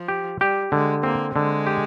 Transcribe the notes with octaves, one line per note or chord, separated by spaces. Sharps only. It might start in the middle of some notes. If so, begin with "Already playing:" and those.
Already playing: F3
G4
G3 G4
D3 G#3
A#3 C4
D3 G#3
G4